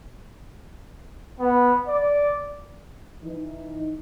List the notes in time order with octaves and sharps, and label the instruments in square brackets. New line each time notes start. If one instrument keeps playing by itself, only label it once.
[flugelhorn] B3
D5
[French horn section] E3 D#4